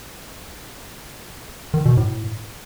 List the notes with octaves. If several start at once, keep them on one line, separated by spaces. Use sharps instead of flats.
D#3
B2
A2